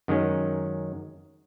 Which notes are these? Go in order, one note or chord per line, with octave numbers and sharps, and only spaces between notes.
F#2 D#3 G#3 C#4